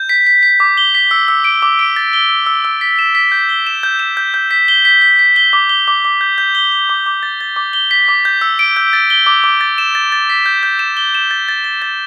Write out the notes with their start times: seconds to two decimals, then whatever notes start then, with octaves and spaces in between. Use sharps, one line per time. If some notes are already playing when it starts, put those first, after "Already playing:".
Already playing: G6
0.09 B6
0.27 B6
0.43 B6
0.60 D6
0.77 G7
0.95 B6
1.11 E6
1.28 E6
1.44 D7
1.62 D6
1.79 D7
1.96 A6
2.13 G7
2.29 E6
2.46 E6
2.65 E6
2.81 B6
2.99 E7
3.15 B6
3.32 G6
3.49 G7
3.67 E7
3.83 G6
3.99 E7
4.17 G6
4.34 G6
4.51 B6
4.68 G7
4.85 B6
5.02 B6
5.19 B6
5.36 G7
5.53 D6
5.69 G7
5.88 D6
6.05 D6
6.21 G6
6.38 G6
6.55 G7
6.72 G7
6.89 D6
7.06 D6
7.23 A6
7.41 A6
7.56 D6
7.73 G7
7.91 B6
8.08 D6
8.25 G6
8.41 E6
8.59 D7
8.77 G6
8.93 A6
9.10 G7
9.26 D6
9.44 D6
9.61 A6
9.78 E7
9.95 A6
10.12 A6
10.30 B6
10.46 G6
10.63 G6
10.79 E7
10.97 G7
11.15 E7
11.31 A6
11.48 A6
11.64 A6
11.82 A6